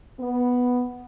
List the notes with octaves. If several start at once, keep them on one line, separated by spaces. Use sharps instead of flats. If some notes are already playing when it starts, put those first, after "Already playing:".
B3